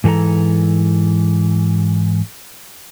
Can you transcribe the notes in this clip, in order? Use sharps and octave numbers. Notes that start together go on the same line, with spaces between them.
G#2 E3 G#4 A4 A#5